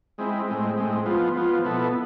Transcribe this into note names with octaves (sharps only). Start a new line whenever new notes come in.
G#3 C4 E4
A2 G#3 C4
A2 G#3 C4
F3 B3 F4
F3 B3 F4
B2 B3 E4 A4